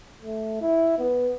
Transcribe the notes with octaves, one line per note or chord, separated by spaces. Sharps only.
A3
E4
B3